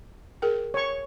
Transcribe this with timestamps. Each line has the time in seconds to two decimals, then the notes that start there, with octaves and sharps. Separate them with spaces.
0.42 G#4 A#4 G5
0.74 C#5 C#6